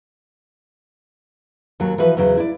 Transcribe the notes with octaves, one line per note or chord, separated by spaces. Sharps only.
D#2 F#3
E3 F3 F#4 B4
E2 C#3 F#3
E4 D5